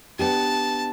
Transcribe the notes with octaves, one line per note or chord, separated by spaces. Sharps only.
B3 D4 G4 A5